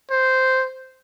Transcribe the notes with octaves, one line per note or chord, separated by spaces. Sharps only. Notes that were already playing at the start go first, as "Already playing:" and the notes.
C5